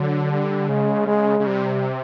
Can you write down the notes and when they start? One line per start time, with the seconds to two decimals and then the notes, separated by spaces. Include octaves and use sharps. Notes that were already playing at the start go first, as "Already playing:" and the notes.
Already playing: D3 F#3
0.31 G3
0.69 C#3 G#3
1.07 G#3
1.40 C#3
1.47 C3 G3